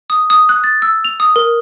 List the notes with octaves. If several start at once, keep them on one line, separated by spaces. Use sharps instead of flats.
D#6
D#6
F#6
A6
E6
F7
D#6
A#4